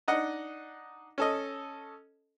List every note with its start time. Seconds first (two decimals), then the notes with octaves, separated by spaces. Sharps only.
0.08 D4 D#4 D#5 F#5
1.18 C#4 A4 D#5